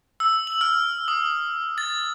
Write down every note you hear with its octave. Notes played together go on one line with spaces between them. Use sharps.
E6
F#7
F6
D#6
A6